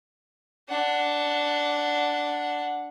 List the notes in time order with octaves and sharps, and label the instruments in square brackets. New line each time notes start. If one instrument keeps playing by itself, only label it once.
[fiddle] D4 F#5